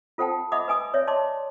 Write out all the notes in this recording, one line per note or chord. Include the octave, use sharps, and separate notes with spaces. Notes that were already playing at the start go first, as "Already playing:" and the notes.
F4 A4 C5 F#5 G5 A5
D#5 E5 F#5 B5 D6 D#6
B4 G#5 D#6
C#5 D5 E5
D#5 A5 C6 D6